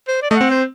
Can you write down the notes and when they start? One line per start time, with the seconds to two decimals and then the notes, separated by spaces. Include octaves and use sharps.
0.08 C5
0.22 D5
0.31 A3 D#5
0.36 C4 F#5
0.51 C5